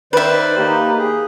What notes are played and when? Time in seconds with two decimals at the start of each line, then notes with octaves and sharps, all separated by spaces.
0.13 D#3 B4 C5 D5 E5
0.58 A#3 D#4 G4
0.98 G#4